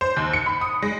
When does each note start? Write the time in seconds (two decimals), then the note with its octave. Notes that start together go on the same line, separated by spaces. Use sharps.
0.01 C5
0.16 D#2
0.33 C#7
0.46 B5
0.61 D#6
0.82 G#3